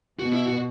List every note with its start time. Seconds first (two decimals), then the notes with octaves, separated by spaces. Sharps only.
0.19 B2 F#4
0.33 E4
0.47 F#4